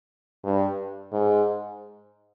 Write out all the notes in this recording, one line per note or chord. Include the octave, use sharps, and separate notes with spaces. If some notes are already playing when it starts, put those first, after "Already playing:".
G2
G#2